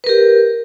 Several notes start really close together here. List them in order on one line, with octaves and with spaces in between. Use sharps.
B4 A#4 G4